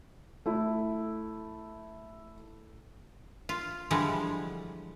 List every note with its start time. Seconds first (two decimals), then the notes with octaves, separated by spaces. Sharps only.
0.46 A3 E4
3.49 F4
3.91 D3 E3 F3 G3 G#3